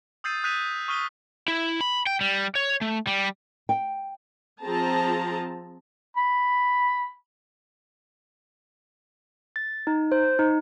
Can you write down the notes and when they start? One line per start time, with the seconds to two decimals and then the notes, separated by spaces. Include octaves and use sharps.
0.24 D#6 E6 G6 A6 C7 D#7
0.44 D#6 F#6 G6 B6 D#7 F7
0.88 C#6 D#6 F6 B6 D#7 G7
1.48 E4
1.81 B5
2.07 G5
2.21 G3
2.55 C#5
2.81 A3
3.07 G3
3.69 G5
4.62 F3 C4 G#4 A5 A#5
6.17 B5
9.56 A6
9.87 D#4
10.12 C5
10.39 D#4